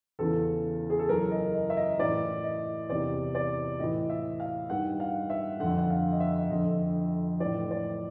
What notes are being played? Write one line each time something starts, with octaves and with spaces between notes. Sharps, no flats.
E2 C#3 E3 A4
G#4
A4
F#2 C#3 E3 A#4
D#5
D#5
E5
D#5
A2 E3 D5
D#5
E2 C3 E3 D5
D5
A2 E3 D#5
E5
F5
G2 D#3 F#5
F5
E5
F2 D3 F#5
F#5
F5
D#5
E5
F2 D3 D#5
A2 E3 D5
D5